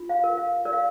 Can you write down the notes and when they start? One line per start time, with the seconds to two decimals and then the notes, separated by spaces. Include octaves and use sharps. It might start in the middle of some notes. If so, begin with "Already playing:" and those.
Already playing: F4
0.09 F5
0.24 A#4
0.37 F5
0.65 A#4 D5
0.73 F5